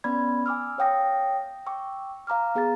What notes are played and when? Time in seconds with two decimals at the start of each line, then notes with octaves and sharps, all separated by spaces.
0.04 B3 C#4 D5 B5 G#6
0.46 G#5 D6 E6 F6
0.78 C#5 F5 G5 D#6 A#6
1.66 G5 C#6 D6 E6
2.27 F5 A#5 D6 F6
2.55 B3 G#4 F5 A#5 A6